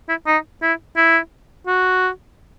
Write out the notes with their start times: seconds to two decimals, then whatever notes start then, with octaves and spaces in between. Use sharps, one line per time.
0.09 E4
0.27 D#4
0.62 E4
0.97 E4
1.67 F#4